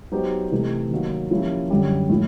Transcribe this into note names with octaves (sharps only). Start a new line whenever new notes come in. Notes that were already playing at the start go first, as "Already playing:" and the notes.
F#3 B3 D#4 G4 C5
C3 E3 A3
D#3 F#3 A#3
F3 A#3 C#4 E4 G4
F#2 D3 G3
A2 F3